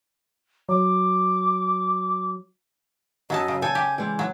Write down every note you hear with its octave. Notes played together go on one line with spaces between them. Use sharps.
F#3 D6
F#2 F#3 A4 D#5 A5
C#3
A4 G#5 G6
G4
E3 G#3
F#3